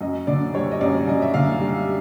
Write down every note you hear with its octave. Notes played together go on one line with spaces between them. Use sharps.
F#2 D#5
D3 D5
G3 C#5
D#5
F#2 D5
F#2 D#5
E5
D3 F5
G3